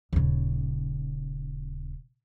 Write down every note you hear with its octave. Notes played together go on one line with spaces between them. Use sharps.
D#1 C#3